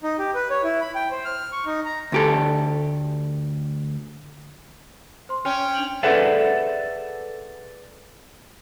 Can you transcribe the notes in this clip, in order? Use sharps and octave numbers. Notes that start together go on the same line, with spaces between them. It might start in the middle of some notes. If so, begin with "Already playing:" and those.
D#4
G4
B4
C#5
E4
B5
G5
C5
F6
C#6
D#4
A#5
D2 G4 A4
C5 C6
C#4 G5
D4 F7 F#7
G#4 A4 B4 D5 E5 F#5